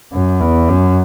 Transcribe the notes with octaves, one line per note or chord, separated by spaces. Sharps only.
F#2
E2
F#2